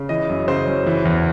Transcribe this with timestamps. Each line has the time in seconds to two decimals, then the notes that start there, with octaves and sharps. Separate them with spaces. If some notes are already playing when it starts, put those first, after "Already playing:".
Already playing: C#3
0.09 E3 D#5
0.29 F#2
0.48 C#3 C5
0.67 F#2
0.87 E3
1.05 E2